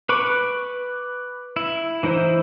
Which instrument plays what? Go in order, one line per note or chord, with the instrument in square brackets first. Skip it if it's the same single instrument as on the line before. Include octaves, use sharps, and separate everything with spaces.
[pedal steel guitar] B4 B5 C#6 D6
E4
E3 D#4 E4 C5